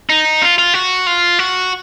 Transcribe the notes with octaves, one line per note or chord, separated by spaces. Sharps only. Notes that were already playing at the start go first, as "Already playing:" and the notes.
D#4
F4
F4
F#4
F4
F#4